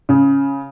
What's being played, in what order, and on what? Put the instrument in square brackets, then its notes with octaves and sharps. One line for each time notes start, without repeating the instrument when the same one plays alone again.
[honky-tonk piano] C#3